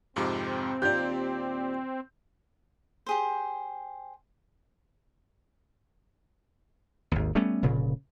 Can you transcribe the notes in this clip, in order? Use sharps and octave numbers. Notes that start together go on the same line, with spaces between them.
F2 G#2 C3 C4 F4 G4
D#2 A#2 G4 D5 A#5 G6
G4 G#4 C5
G#1 D#2
G3 A3 B3 C#4
F1 A#2 C#3